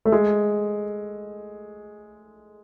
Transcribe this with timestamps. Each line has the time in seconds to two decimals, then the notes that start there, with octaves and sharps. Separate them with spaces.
0.06 A3
0.12 G#3